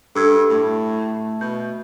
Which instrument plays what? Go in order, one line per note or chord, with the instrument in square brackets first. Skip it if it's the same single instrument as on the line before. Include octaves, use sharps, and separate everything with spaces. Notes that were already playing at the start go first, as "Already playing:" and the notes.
[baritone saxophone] G2 [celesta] A4 E6 G#6
[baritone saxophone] A2 [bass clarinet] A3
[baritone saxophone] B2 [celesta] G6